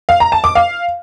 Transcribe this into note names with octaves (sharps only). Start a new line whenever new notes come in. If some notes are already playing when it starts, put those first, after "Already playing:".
F5
A#5
A5
D6
F5